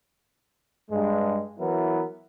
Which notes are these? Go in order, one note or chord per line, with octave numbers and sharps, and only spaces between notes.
G2 G#3
E3 F#3 B3 E4 A#4